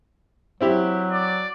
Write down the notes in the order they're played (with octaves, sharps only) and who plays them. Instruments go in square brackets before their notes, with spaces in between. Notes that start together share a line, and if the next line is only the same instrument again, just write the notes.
[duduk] F#3 [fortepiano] C4 E4 G4
[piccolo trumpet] D5